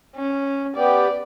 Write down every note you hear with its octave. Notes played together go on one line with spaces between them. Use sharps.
C#4
B3 G4 D5